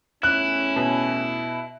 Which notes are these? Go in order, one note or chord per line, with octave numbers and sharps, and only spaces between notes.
E2 A2 C#4 E4 F#6
B2